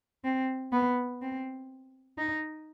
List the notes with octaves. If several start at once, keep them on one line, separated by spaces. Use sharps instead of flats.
C4
B3
C4
D#4